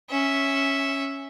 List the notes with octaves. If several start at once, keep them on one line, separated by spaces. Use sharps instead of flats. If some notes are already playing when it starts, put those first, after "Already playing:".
C#4 E5